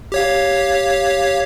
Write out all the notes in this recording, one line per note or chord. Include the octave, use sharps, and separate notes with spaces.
G4 C#5 F5